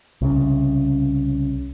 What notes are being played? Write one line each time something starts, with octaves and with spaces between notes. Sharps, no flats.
C2 C#3